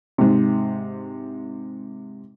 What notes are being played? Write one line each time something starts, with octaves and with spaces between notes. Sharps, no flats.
G#2 C3